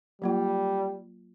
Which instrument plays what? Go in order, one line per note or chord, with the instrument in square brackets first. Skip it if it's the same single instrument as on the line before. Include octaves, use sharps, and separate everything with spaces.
[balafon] F#3 A#3 F4 [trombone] G3